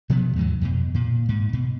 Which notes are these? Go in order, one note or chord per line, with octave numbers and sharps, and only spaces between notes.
B2 F3 F#3 B3
D#2 G#2 E3 F#3
F2 B2
A#2
G#2
B2